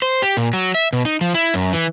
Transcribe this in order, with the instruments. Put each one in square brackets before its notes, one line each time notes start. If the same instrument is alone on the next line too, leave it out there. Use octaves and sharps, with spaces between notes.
[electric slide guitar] C5
G4
A#2
F#3
E5
B2
D#4
F3
E4
F#2
E3